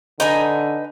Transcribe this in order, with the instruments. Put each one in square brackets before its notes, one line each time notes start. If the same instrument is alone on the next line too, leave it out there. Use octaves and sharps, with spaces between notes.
[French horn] D3 [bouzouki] D#4 B4 G#5